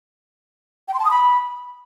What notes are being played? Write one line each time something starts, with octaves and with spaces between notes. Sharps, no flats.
G5
C6
A5
D#6
B5